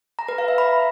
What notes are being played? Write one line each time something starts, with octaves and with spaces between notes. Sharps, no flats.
A#5
B4
F5
E5
B5